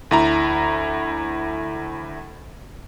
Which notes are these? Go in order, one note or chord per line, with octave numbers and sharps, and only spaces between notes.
D2 E4 A#5